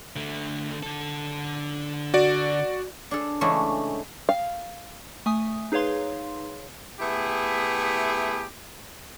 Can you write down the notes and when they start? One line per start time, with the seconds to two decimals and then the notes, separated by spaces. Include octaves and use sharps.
0.17 D3 A3
0.83 D3 A4
2.14 F#4 D5
3.11 D4 G#4 A4
3.41 C#3 E3 G#3 A3 D4 E4
4.29 F5
5.26 A3 E5 G#5 D#6
5.72 D#4 G#4 B4 C#5 F5 C6
7.00 A3 B3 E4 G4 G#4